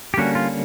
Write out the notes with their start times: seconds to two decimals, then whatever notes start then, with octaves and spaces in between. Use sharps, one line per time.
0.14 G4
0.17 D3 G3 A#3 C#4 F#4
0.35 F4